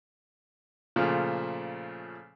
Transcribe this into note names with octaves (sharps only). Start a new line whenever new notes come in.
A#2 C#3 F3 A3